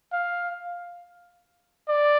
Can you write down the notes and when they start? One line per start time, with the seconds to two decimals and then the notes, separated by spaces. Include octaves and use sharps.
0.12 F5
1.88 D5